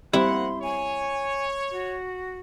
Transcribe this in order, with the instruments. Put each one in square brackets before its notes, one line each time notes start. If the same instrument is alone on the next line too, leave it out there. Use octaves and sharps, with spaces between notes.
[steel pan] G3 C4 G4 [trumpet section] A#3 F#5 [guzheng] E4 [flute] C6
[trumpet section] C#5 [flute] G#5
[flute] F#4